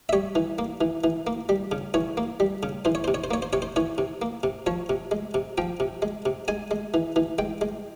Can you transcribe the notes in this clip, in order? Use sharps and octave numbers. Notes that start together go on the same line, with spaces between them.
E5
G3 C#5
E3
A#3
E3
E3
A#3
G3
C#3
E3 C#5
A#3
G3
C#3
E3 C5
C#5
C3 C5
C#5
C5
A#3 C#5
C5
C3 C#5
C5
E3 C#5
C3
A#3
C3
F3 C#5
C3
G#3
C3
F3 G5
C3
G#3
C3
G#3 G#5
G#3
E3
E3
G#3 G5
G#3